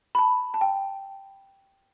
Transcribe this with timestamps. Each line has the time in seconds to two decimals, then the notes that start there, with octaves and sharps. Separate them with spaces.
0.15 B5
0.19 A5
0.54 A5
0.61 G5